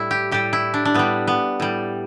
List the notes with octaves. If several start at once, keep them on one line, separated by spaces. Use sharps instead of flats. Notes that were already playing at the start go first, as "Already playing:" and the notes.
Already playing: A2 G3 E4
G4
A2 G3 G4
E4
D4
D4
A2 G3 B3
B3
A2 G3